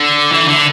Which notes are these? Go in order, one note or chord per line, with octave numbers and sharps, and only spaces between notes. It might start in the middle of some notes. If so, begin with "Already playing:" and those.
Already playing: D3
E3
D3